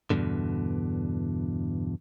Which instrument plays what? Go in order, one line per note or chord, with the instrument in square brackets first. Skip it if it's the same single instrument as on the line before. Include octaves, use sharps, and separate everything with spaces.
[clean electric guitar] E2 G2 B2 D3